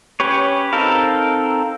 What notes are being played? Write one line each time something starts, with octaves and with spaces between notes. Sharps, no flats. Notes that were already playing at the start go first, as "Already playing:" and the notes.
C#4 G4 B4 C#5
C4 D#4 A4 A#4 F5